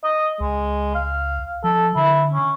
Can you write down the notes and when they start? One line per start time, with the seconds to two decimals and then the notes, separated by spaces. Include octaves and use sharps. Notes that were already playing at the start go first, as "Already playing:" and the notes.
0.04 D#5
0.40 C#2 G#3
0.95 F5
1.64 F3 A4
1.96 D3 E4
2.33 C#4